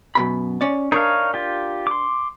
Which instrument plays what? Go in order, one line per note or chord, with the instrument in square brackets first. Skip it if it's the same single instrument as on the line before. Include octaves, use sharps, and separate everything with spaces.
[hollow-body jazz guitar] F#2 B2 B5
C#4 D5
[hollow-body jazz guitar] D4 A#4 [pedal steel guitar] D#4 C#5 F5
[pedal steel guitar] F4 G4
C6 D6